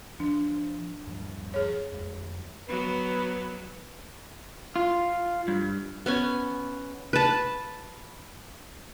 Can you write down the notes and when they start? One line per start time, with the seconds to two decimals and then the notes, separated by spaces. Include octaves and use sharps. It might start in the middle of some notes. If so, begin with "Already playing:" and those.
0.20 F3 D4
1.07 G2 F3 G3
1.54 G#4 C#5
1.92 F2 G#3
2.69 F#3 B3 B4
4.76 F4
5.48 G2
6.06 B3 C#4 G#5
7.13 B4 A5